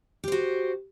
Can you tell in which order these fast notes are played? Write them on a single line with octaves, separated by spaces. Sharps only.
G4 C5 F#4